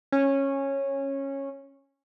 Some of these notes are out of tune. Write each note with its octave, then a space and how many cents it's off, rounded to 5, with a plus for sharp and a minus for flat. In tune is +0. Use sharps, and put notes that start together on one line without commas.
C#4 -15